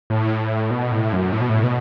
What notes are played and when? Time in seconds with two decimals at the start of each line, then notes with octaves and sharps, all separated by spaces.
0.10 A2
0.71 B2
0.91 A2
1.13 F#2
1.32 A2
1.41 B2
1.49 A2
1.64 B2